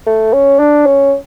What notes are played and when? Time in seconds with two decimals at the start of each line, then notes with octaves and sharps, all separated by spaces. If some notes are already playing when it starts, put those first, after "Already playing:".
0.07 A3
0.33 C#4
0.59 D4
0.86 C#4